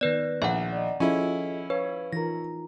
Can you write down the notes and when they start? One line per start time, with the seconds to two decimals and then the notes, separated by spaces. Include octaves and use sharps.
0.01 D#3 B3 B4 D5 F#6 G6 A#6
0.42 A#1 E5 F#5
0.72 D5 D#5
1.00 F3 C#4 E4 F4 G#4 A4 D#5
1.70 B4 C#5 F5
2.13 E3 D#4 F4 A#4 A#5 A#6